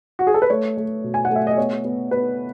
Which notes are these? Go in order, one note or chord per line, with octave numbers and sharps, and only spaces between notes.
F#4
G#4
A4
B4
A3 C#5
A3
B2
G#5
F#5
A3 E5
D#5
B3 C#5
B3
B3 B4